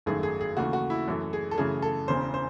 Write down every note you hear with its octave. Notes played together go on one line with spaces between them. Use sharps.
G#1 F#2 D#3 F#3 A3 G#4
G#4
G#4
D#2 C#3 E3 A3 F#4
F#4
E4
F#2 E3 A3
G#4
A4
F#2 C#3 E3 A3 G#4
A4
E1 E2 C#3 C5
C5